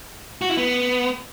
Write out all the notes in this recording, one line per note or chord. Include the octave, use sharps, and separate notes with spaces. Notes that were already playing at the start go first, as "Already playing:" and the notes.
F#4
E4
B3